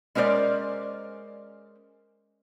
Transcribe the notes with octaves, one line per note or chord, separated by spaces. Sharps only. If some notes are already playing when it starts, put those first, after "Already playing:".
G#3 C#4 A#4 C5 D5